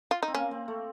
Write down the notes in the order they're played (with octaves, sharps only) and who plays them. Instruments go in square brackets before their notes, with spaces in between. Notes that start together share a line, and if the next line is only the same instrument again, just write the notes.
[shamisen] F4
D#4
[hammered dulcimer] C4
[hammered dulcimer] A#3 [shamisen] C#4
[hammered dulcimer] C4
A3